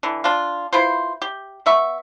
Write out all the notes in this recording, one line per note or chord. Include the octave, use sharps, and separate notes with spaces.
D3 E3
D4 F4
E4 F4 B4 C5
G4
B3 E5 C#6